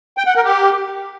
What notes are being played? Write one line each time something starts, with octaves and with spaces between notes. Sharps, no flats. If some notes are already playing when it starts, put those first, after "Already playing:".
G5
F#5
A#4
G4